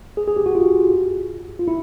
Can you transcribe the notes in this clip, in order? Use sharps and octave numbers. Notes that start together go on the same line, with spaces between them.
G#4
G#4
G4
F#4
F4
F4
E4